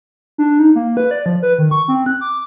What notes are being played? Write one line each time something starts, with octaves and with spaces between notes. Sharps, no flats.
D4
D#4
A#3
B4
D5
F3
B4
D#3
C#6
C4
F#6
D6